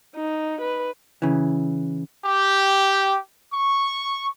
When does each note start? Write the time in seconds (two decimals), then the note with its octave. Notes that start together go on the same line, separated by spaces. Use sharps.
0.16 D#4
0.61 B4
1.22 C#3 E3
2.25 G4
3.52 C#6